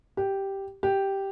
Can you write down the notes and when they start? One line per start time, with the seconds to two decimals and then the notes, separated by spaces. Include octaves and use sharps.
0.17 G4
0.83 G4